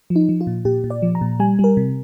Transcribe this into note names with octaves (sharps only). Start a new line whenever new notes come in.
F3
D#4
F3
F4
A#2
A#2 G4
A#2
D5
F3
A#5
A#2
G3 G#5
G3 A#4
C3